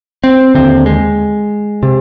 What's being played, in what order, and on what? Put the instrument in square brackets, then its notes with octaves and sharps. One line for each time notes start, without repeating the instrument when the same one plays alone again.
[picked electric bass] C4
D#2 D3 C4
G#3
C3